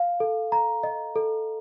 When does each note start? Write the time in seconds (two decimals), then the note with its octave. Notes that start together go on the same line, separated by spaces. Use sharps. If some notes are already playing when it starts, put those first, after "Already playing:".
Already playing: F5
0.20 A4
0.52 A#5
0.83 D#5
1.16 A4